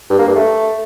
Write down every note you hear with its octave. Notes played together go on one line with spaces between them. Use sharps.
G2
A#3
G2
A3